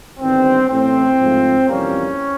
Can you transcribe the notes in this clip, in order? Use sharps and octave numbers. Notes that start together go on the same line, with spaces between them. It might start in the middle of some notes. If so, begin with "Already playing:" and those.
G1 G2 D#3 C4
A1 A2 E3 A3 C4
G#2 F3 A3
F2 C3 E3 G3 A#3 C#4